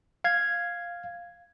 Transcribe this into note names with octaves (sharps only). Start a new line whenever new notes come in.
F5 G#6